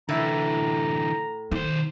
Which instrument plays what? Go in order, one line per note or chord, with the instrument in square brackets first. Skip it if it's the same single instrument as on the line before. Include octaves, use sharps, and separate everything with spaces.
[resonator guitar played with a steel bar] A2 A4 E5 [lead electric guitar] D3 E3 [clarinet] A#5
[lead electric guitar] B1 C5 [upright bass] D#3